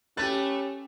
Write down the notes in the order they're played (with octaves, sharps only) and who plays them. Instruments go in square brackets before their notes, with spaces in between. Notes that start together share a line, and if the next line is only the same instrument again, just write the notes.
[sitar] A3 B4 [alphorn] C#4 [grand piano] G4 A6